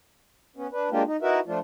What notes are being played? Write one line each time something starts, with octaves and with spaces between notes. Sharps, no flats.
B3 C#4
D4 B4
G#3 A#3 D4 F4 G4
D#4
D#4 E4 F#4 A#4 B4 E5
F3 A3 D4 F4